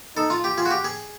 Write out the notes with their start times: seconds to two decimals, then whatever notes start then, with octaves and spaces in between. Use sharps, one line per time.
0.16 D#4 A4
0.30 F4
0.44 G4
0.57 F4 G#4
0.65 F#4
0.71 G4
0.84 G#4